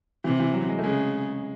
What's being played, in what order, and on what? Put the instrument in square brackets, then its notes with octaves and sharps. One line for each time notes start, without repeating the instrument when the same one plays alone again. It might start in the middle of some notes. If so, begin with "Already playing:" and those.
[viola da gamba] C3 [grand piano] E3
[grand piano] E3
F#3
G#3
A3
[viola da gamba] C#3 [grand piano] G#3